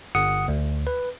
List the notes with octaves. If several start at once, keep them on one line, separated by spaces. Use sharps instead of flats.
G1 F#5 D#6 C#7
D2
B4